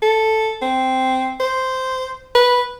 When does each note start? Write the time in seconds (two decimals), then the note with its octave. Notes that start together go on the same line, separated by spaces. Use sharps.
0.02 A4
0.62 C4
1.40 C5
2.35 B4